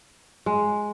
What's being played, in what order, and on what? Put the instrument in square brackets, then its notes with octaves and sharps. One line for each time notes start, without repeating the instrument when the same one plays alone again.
[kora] G#3